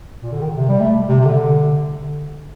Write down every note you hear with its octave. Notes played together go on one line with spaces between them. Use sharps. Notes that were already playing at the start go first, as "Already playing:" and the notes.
A#2
D3
D#3
C3
G3
A3
C3
C3
D3